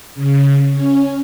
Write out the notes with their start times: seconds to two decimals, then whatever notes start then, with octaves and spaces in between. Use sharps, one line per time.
0.15 C#3
0.72 C#4